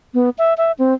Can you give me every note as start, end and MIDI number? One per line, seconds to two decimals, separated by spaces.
0.14 0.30 59
0.38 0.54 76
0.58 0.72 76
0.79 0.94 60